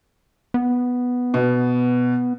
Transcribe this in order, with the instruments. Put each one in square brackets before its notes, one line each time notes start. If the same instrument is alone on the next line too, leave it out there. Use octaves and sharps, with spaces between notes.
[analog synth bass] B3
[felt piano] B2